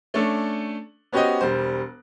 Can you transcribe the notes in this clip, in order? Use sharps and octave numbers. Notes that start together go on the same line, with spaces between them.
A3 C#4 D4 A4
B3 C#4 F#4 G4 C5 D#5
E1 G3 C5